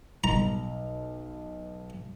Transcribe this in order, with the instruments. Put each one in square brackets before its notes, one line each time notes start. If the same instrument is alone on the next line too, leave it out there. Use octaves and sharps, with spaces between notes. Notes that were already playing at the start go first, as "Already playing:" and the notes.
[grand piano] B1 [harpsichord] A#5